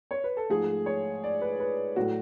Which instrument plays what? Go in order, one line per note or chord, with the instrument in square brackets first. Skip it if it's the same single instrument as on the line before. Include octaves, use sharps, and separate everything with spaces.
[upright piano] C#5
B4
A4
G#2 F3 A3 G#4
C#5
D5
B4
B4
A2 F#3 A3 F#4